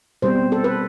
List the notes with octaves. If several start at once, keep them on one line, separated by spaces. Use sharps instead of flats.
B2 G3 C4 C5
A4
B4